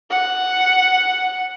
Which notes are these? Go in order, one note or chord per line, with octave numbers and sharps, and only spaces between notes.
F#5